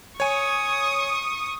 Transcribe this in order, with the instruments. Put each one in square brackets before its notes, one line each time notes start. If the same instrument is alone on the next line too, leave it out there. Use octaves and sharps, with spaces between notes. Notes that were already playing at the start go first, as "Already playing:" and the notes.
[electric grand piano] C#5 G#5 [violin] C#6 D#6